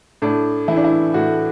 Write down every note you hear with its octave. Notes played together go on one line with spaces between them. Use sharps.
A2 D4
E3 E4
D4
E4
A2 F#4